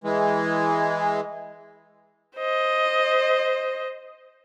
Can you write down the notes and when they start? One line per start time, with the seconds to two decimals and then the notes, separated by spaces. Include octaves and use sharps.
0.04 E3 G#3
2.37 C5 D#5